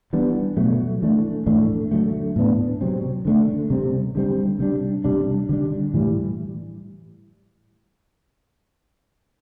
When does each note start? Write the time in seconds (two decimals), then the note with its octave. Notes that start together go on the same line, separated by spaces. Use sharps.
0.13 E3 G3 B3 D4
0.57 B2 F#3 A3
1.02 E3 A3 D4
1.46 A2 E3 A3 D4
1.91 D3 F#3 A3
2.36 A2 E3 B3 D4
2.81 C3 F#3 C4
3.25 D3 A3 D4
3.70 C3 G3 C4
4.15 D3 G3 C4
4.59 C3 G3 D4
5.04 C3 G3 D4
5.49 D3 G3 D4
5.94 A2 E3 G3